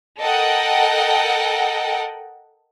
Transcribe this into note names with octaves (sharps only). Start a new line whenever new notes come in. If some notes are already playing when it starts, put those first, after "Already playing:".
A4 A#4 D#5 F#5 G5